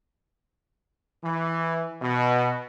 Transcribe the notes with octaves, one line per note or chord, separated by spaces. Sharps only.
E3
B2